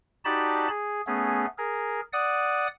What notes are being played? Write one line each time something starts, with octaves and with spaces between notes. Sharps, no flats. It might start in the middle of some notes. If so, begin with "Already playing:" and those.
D#4 F#4 G4 D5 A5 B5
G#4
A3 B3 C#4 G#4
G#4 A#4
D5 F#5 D#6